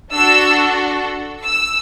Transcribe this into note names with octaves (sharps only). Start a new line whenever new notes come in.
D4 F#4 A4 E6
E6